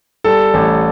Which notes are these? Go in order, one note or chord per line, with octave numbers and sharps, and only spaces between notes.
G3 A4
A1